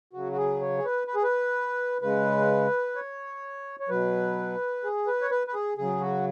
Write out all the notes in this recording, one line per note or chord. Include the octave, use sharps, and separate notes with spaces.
C#3 F#3 F#4
F#4
G#4
C#5
G#4
B4
B4
G#4
B4
C#3 G#3 B4
C#5
C#5
B2 F#3 B4
G#4
B4
C#5
B4
B4
G#4
C#3 F#3 G#4
F#4